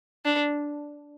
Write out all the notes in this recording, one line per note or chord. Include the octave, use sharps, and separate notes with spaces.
D4